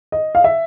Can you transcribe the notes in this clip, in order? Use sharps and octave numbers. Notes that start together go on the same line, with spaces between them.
D#5
F5
E5